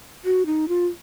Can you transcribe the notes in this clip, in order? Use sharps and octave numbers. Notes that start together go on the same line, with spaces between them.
F#4
D#4
F4